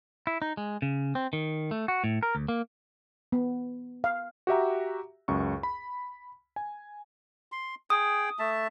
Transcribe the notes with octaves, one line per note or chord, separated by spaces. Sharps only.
E4
D#4
G#3
C#3
C4
D#3
A3
F#4
A2
A#4
D2
A#3
B3
F5
F#4 G4 E5 A#5
C#2 F#2 C#6
B5
G#5
C6
G#4 G5 D#6
A3 E5 A5